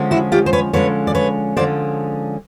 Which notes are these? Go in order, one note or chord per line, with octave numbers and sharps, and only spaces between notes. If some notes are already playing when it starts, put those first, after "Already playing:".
Already playing: D3 F3 G#3 C#4
E4 F#4
F4 G4
C5
B4 C#5
D3 F3 G#3 C#4 B4 C#5
D5
B4 C#5
D3 F3 G#3 C#4 C5 D5